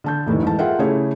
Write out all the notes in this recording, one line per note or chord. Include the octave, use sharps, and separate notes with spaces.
D3 A5 G6
F1 A2 D#3 E3
G#2 E3 A5
F4 G#4 A#4 E5 F#5 G5
C#3 A3 E4 G4 G#4 C#5